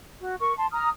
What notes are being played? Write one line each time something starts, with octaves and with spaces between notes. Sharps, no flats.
F#4
A#4 C#6
A5 C6
A#5 D#6 F6